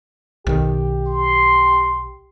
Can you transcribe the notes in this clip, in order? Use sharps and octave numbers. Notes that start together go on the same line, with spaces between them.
B1 D#3 G4
C6